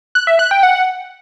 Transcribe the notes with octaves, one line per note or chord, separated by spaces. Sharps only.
F#6
E5
F#6
G5
F#5